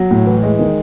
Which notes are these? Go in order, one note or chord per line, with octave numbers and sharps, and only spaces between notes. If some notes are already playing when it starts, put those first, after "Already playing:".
Already playing: F#3
A2
E3
G#3
D#3